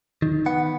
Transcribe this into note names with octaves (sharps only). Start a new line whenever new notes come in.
D#3
B3 F#5